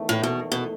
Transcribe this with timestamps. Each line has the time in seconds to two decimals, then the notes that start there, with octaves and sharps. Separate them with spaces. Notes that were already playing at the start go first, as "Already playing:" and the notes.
Already playing: E2 D#3 A3
0.09 A2
0.23 B2
0.52 B2